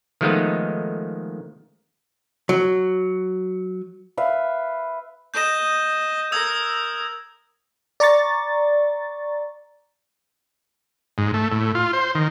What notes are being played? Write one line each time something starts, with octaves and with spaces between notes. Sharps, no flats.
D#3 F3 G#3 A3 B3 D#4
F#3
B4 E5 F5
D#5 G6 E7
A#4 D#6 E6 G#6
D5 A#5 C#6 A6
G#2
A3
A2
F4
C5
D#3